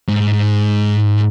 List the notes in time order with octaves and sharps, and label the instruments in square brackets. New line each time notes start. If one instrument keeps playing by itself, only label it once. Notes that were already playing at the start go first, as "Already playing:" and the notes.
[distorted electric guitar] G#2